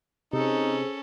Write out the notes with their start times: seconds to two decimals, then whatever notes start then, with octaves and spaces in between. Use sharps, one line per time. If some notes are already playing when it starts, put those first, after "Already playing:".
0.33 C3 C#4 D#4 G#4 A4 C5 E6